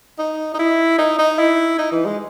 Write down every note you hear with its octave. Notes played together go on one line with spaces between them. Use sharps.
D#4
D#4
E4
D#4
D#4
E4
D#4
E3
G#3